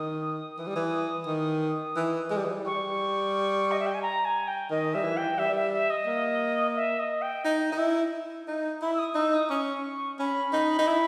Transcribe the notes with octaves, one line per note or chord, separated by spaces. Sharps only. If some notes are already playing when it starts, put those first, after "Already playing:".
Already playing: D#3 D#6
E3
G3
E3
D#3
E3
G#3
G3
E3
G3
G3 C#6
D#5
E5
G5
G#5
A#5
G#5
G5
D#3 D#5
G3 E5
E3
G5
G3 E5
E5
E5
D#5
A#3
E5
D#5
G5
D#4
D#4
E4
D#4
E4 B5
E6
D#6
D#4 E6
D#6
C#4 C#6
C#4 B5
D#4
D#4
E4